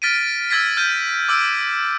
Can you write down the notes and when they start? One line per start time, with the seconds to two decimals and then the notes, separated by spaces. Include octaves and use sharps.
0.02 F6 A6 B6 D7 D#7
0.50 E6 F6 G#6 A6 B6
0.77 F6 G6 D#7
1.29 D6 E6 D7